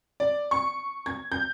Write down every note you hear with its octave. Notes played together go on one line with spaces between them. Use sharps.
D5
C#6
G#6
G6